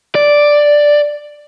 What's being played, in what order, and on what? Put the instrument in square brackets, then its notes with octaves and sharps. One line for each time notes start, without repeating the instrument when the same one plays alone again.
[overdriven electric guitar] D5